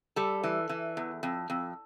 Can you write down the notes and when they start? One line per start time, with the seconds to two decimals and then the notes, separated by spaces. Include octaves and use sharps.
0.16 G3 A4
0.44 E3
0.69 E3
0.97 E2
1.23 F2
1.50 F2